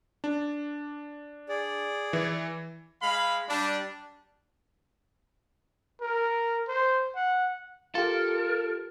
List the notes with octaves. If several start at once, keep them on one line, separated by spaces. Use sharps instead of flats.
D4
G#4 D5
E3
G#3 F5 B5
G3 D4
A#4
C5
F#5
F4 G4 A4 A#4